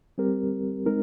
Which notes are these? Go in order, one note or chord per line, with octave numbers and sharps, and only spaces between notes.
G3 C4 G4 A#4
G#3 C4 D#4 A#4